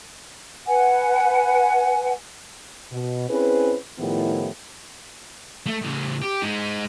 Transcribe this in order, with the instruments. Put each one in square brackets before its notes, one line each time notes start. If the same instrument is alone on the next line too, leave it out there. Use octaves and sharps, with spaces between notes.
[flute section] B4 F#5 G#5
[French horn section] B2
C4 C#4 E4 G#4 B4
A2 D#3 F3 B3 E4 G4
[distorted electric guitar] A3
A2 C#3
G4
G#3 D#4